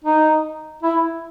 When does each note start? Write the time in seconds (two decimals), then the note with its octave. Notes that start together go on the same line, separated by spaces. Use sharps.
0.04 D#4
0.83 E4